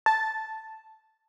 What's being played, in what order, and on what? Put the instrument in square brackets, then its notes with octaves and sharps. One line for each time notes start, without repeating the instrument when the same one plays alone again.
[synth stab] A5